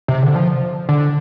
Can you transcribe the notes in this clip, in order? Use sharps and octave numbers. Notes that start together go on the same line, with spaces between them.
C3
D3
F3
D3